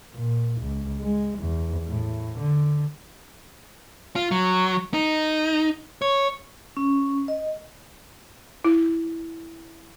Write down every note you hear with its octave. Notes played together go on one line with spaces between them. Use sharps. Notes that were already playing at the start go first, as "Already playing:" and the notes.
A#2
C#2
G#3
E2
A2
D3
F4
F#3
D#4
C#5
C#4
D#5
E4